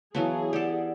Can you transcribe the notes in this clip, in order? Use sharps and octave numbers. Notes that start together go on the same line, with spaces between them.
E3 F#3 B3 G#4 C#5 F5 A5
G4 A4 D5 F#5